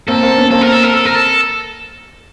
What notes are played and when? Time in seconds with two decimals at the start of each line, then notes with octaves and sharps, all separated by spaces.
0.08 A#3 C4 A4
0.23 A#3 C4
0.37 B3 C#4
0.51 A#3 C4 A4
0.62 A#4
0.72 A4
0.84 A#4
0.94 A4
1.05 A#4
1.15 A4